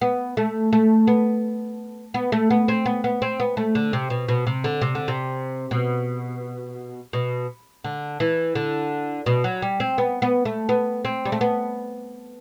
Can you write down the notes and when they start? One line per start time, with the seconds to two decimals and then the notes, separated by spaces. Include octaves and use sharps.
0.01 B3
0.37 A3
0.73 A3
1.07 B3
2.14 B3
2.32 A3
2.50 B3
2.68 C4
2.86 B3
3.04 B3
3.22 C4
3.40 B3
3.57 A3
3.75 D3
3.93 C3
4.10 B2
4.28 B2
4.47 C3
4.64 D3
4.82 C3
4.95 D3
5.08 C3
5.71 B2
7.13 B2
7.84 D3
8.20 E3
8.55 D3
9.26 B2
9.44 F#3
9.62 G3
9.80 C4
9.98 B3
10.22 B3
10.45 A3
10.69 B3
11.05 C4
11.25 G3
11.32 A3
11.41 B3